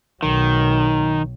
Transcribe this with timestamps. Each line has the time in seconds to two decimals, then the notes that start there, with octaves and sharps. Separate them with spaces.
0.23 B1 D#3 F#3